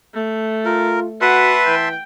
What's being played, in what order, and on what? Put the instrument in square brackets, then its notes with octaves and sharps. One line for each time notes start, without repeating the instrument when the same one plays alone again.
[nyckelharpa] A3
[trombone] F4 [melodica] A#4
[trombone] F#4 [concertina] B4 [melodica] E5 A5 C6 [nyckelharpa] F#5
[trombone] E3 [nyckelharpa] G5